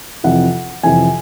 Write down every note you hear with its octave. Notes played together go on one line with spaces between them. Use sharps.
F2 C3 E3 F#5
F2 C3 E3 G#5